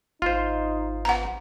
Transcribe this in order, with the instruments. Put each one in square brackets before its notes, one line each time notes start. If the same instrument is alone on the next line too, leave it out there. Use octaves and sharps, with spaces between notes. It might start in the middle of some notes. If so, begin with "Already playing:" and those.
[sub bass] G#1 [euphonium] D#4 [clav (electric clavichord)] F4 C5
[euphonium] B3 [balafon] F#5 A#5